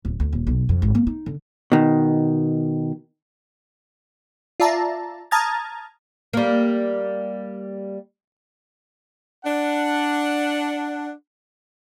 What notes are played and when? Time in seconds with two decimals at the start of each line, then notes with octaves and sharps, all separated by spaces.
0.05 D1
0.20 D2
0.33 D#1
0.47 B1
0.69 F2
0.82 G#1
0.95 A#3
1.07 D#4
1.26 D3
1.72 B2 D#3
4.60 F4 D5 E5 A5 A#5
5.31 A5 A#5 D#6 F6 G#6 A6
6.33 G3 A#3
9.45 D4 F#5